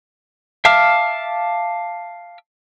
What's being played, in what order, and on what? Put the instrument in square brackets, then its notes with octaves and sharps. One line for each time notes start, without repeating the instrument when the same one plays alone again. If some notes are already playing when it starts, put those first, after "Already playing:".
[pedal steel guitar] E5 F5 A5 D6 F6